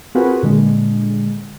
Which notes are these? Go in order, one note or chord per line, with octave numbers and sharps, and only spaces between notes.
C4 F4 F#4 G#4 A#4 B4
A#2 D3 G#3